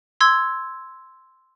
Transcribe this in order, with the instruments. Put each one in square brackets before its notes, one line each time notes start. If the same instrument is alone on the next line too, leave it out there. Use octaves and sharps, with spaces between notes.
[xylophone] C6 E6 G#6